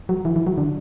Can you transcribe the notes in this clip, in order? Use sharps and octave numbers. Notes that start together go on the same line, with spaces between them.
F#3
E3
E3
F#3
D3